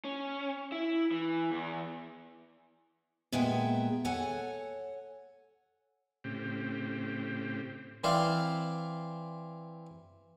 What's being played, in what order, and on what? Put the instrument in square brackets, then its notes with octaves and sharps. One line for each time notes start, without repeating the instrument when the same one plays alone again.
[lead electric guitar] C#4
E4
E3
E2
[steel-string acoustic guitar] A#2 G#3 B3 G#4 E5 G5
A4 C#5 F#5 G#5
[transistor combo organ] A2 C#3 C4 G4
[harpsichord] E3 C4 C5 D5 F5